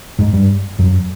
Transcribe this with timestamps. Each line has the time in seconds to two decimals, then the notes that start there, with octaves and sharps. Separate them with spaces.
0.19 G#2 G#3
0.33 G2 G3
0.79 F#2 F#3